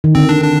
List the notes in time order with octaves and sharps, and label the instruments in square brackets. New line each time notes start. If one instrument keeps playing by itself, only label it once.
[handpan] D#3
[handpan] D3 [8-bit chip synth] C4
[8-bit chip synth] D4
D4